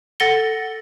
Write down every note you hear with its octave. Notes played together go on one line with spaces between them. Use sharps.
A4 F#5 A6 A#6 C#7 G7